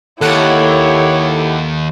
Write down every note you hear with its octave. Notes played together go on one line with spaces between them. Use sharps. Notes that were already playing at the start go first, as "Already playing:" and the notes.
D#2 E4 G4 A4 C#5 F#5